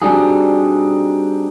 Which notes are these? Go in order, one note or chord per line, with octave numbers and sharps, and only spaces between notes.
G3 C4 D4 D#4 F#4 G#4